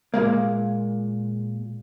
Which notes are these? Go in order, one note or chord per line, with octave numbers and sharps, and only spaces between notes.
A#2 F3 G#3 A#3